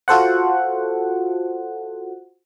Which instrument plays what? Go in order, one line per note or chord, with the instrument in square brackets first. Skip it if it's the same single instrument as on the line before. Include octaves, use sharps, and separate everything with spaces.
[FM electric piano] F4 F#4 A4 C5 F#5